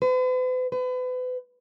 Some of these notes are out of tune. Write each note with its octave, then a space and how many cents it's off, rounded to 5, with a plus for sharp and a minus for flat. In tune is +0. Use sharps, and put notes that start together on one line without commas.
B4 +45
B4 +35